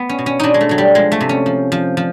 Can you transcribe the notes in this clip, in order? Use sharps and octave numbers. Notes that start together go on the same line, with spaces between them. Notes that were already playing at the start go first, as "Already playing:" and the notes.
Already playing: B3
C#4
B2
C#4
B2 D4 D#4
G#3
A3
B2 F#3
G3
F3 G#3
A3
C3
C#4
F3
F3
F3